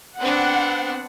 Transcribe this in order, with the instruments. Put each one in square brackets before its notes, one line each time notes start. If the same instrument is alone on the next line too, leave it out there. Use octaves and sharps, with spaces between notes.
[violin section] B3 C4 D4 [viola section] F#5